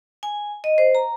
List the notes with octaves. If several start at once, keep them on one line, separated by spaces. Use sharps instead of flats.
G#5
D#5
C5
A#5